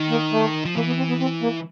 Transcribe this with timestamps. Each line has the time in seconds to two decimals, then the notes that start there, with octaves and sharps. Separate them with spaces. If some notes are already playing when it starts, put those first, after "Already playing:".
Already playing: D#3
0.10 A#3
0.32 A3
0.65 F3
0.76 E3 A#3
0.87 B3
0.97 C4
1.09 B3
1.20 C4
1.42 A#3